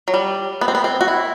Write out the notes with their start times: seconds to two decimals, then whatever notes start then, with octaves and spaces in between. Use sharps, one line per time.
0.08 F#3
0.14 G3
0.61 B3
0.68 C4
0.75 B3
0.84 C4
1.01 F#4
1.08 E4